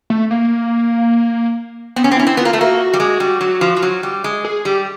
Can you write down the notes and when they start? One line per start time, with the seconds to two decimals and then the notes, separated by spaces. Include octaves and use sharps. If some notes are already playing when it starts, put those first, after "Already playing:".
0.10 A3
0.31 A#3
1.96 B3 C4
2.04 C#4
2.11 C4
2.17 C#4 E4
2.27 C4
2.37 B3 F4
2.45 A#3
2.53 A3
2.59 A#3 F#4
2.94 G3
3.00 G#3
3.20 G3
3.41 F#3
3.61 F3
3.77 F3
3.82 F#3
4.03 G3
4.24 G#3
4.45 G#4
4.65 G3 G4